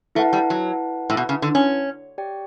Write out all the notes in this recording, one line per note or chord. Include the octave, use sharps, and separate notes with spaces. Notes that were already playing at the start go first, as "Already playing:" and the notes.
A3 E4 B4 F#5 A5
G3
F#3
A2
B2
C#3
D3
C#4
G4 D5 G5